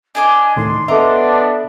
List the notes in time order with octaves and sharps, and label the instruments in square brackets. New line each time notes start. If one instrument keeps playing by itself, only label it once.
[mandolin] D4 D#5 D6 [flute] G#5
[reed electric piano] C#2 A2 D#3 [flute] C6
[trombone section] B3 D4 [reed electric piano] A4 E5 [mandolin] D#5 A#5 D6